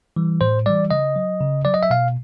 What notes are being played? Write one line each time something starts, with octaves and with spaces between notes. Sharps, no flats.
E3 G3
A2 C5
E3 G3 D5
C#3 D#5
F#3
C#3
F#3 D5
D#5
E5
B2 F5